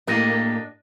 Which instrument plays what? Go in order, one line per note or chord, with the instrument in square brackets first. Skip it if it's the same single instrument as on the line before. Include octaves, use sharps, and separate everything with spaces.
[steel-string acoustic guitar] A2 G4 [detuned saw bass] A#3 [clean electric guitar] D4 D#5